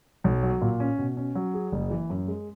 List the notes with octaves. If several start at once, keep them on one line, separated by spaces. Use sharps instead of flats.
B1
F#3
A#2
C#4
B2
C#4
F#3
G#4
F#1
E3
F#2
G#3